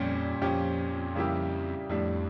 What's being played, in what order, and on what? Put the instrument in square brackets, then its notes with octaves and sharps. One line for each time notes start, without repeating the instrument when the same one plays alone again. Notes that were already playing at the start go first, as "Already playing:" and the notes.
Already playing: [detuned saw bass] F2 [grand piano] A#2 G3 C#4 G4
[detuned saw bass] F2 [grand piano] A#2 F3 C#4 G4
[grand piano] C#3 G3 A#3 E4 G4
[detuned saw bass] F2 [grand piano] A2 G3 D4